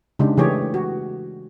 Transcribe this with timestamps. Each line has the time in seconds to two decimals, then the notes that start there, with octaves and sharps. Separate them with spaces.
0.19 C#3 G#3 D4 D#4 G4
0.37 C#3 E3 A3 G4 G#4 C#5
0.74 F#4